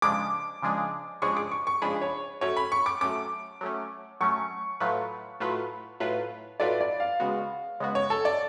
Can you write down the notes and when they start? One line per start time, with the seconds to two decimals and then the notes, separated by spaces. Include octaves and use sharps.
0.02 C#3 F3 G#3 D4 G#4 D6
0.62 C#3 F3 G#3 D4 G#4
1.22 C#3 F3 G#3 D4 G#4 C#6
1.37 D6
1.52 C#6
1.67 C#6
1.82 C#3 F3 G#3 D4 G#4 B5
2.02 C#5
2.41 F#3 A3 C#4 C#5
2.57 B5
2.72 C#6
2.86 D6
3.01 F#3 A3 C#4 D6
3.61 F#3 A3 C#4
4.20 F#3 A3 C#4 C#6
4.80 A2 F#3 A3 F4 B4
5.40 A2 F#3 A3 F4 B4
6.00 A2 F#3 A3 F4 B4
6.60 A2 F#3 A3 F4 B4 D5
6.81 D5
7.00 F5
7.20 C#3 G#3 B3 F#4
7.80 C#3 G#3 B3 F#4
7.95 C#5
8.10 A4
8.25 D5